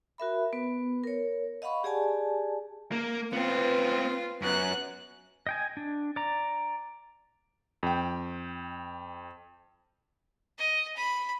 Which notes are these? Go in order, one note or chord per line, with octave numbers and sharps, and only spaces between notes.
F#4 A#4 E5 B5
B3 B4
A#4 C#5
D#5 F5 F#5 B5 C#6
G4 G#4 D5 G#5 A5
A#3
B3 C4 F4 B4
F#2 B3 F#6
D#5 G5 G#5
D4
D5 A#5
F2 G5
D#5
B5